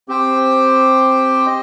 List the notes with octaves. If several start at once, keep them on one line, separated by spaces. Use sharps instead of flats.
C4 G4 C5 G5
D#5